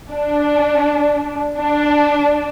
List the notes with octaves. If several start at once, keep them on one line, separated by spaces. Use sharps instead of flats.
D4
D4